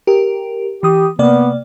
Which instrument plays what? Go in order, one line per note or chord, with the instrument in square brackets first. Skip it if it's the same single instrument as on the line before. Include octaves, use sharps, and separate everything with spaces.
[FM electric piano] G4 A#4
[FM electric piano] E3 D#6 [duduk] G4
[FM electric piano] C3 A#3 D5 [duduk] B3